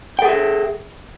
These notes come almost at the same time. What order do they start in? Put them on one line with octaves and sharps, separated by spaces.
G5 A4 G#4 E5